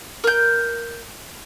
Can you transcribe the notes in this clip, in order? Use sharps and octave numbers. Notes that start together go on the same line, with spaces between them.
A#4 G6